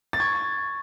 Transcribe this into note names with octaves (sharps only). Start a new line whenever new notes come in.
A6
C#6 G#6